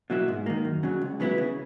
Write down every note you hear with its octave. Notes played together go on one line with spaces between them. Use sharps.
B2 F#3 A#3 E4
G#2
D#3 A#3
F#2
C#3 F#3
C#2
C#3 F#3 B3 E4
C#3